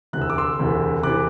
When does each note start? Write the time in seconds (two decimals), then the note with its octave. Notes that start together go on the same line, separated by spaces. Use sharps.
0.13 E1 D2 C3 E3 F#6
0.22 E6
0.30 D6
0.38 C6 E6
0.59 E1 D2 C3 E3
1.03 E1 C3 E3 D6 F#6